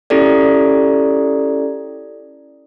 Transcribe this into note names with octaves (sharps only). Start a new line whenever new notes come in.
C#4 E4 G4 A4 D5